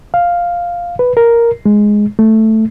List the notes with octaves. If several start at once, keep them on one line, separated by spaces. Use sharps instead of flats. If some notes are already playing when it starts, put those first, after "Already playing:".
F5
B4
A#4
G#3
A3